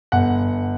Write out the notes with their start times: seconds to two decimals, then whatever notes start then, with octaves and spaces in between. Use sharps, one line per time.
0.12 G1 F#5